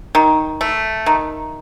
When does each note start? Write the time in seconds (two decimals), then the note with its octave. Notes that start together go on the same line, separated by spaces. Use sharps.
0.15 D#3
0.61 A3
1.06 D#3